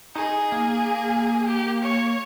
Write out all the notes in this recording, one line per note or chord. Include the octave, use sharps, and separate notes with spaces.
D#4 G#4
A#3
G4
C#5